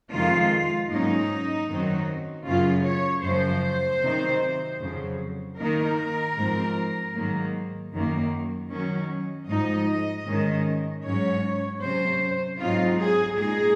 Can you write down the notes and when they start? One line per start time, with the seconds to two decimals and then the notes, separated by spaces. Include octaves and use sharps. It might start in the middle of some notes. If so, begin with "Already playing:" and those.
0.13 F2 C3 D#3 G#3 F4
0.91 G#2 F#3 A#3 C#4 D#4
1.69 F#2 D#3 F#3 C4
2.47 F#2 C#3 F#3 C#4 F4
2.86 C#5
3.24 F#2 C#3 F3 C5
4.02 C3 D#3 F#3 C4 D#4
4.80 F2 C#3 F#3
5.59 D#3 A#3 D#4 A#4
6.36 G#2 F3 C4
7.15 G#2 D#3 F#3 A#3
7.93 F#2 D#3 F#3 A#3
8.71 D#3 F#3 C#4
9.49 G#2 F3 G#3 D#4 D#5
10.26 G#2 D#3 G#3 C#4
11.05 G#2 F#3 C#4 C#5
11.83 C3 F#3 C#4 C5
12.60 G#2 F#3 C4 D#4 F4
12.99 G#4
13.39 A#2 G#3 D#4 G#4